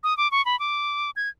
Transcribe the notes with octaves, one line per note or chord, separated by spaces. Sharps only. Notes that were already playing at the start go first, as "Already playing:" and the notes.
D#6
D6
C#6
B5
D6
G#6